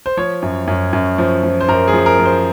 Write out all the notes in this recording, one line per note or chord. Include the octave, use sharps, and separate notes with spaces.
C5
F3 C#5
F#2
F#2
F#2
F3
F3
C5
F#2 A#4
G#4
F3
A#4
F3
C5